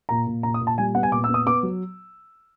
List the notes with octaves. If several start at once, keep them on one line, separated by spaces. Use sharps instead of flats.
A#2 A#5
A#2
A#2 A#5
D#6
A#2
A5
G3 G#5
B3 F#5
G#5
A#2 D6
E6
B3
D#6
B3 D6
F#3